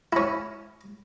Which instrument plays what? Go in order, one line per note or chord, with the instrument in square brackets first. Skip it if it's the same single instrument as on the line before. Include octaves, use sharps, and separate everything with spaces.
[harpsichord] C#4 E4